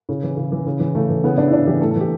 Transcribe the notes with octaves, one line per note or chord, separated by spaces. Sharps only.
C#3
E3
C#3
E3
C#3
E3
C#3 A3
E3
C#3 B3
E3 D4
E4
C#3 D4
E3 G4
A2 A4
A4
E3 G4